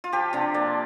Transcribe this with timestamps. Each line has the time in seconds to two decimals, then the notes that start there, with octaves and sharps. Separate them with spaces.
0.04 F4
0.13 F3 G4
0.33 C3 D4
0.54 A#3 D5